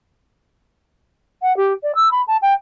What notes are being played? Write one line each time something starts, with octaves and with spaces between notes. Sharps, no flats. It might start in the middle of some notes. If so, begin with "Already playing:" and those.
F#5
G4
D5
E6
B5
A5
G5